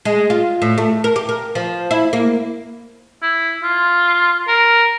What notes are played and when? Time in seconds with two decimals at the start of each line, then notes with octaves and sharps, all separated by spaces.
0.05 G#3
0.30 F4
0.62 A2
0.78 A3
1.04 A#4
1.16 G4
1.29 A#4
1.55 F3
1.91 E4
2.13 A#3
3.22 E4
3.63 F4
4.48 A#4